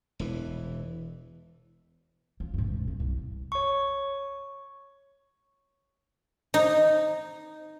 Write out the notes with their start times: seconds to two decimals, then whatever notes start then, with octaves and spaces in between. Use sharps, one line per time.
0.19 E1 E3
2.40 F3
2.54 G2 A#2
2.67 C#2 B2
2.88 G2
3.00 C2
3.52 C#5 C#6
6.54 D#4